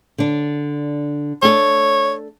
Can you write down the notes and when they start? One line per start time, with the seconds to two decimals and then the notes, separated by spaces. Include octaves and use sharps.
0.18 D3 D4
1.43 A3 D4 A4 C#5